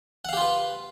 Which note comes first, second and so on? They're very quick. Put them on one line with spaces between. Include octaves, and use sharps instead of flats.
F#5 F5 G4 F4 B4